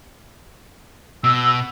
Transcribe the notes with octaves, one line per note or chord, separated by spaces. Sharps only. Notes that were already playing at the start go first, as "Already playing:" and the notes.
B2 E6